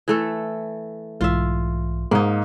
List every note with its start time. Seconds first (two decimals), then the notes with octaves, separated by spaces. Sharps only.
0.08 E3 A3 A4
1.21 B1 G#2 E3 F4 E5
2.11 G#2 A#3 D#4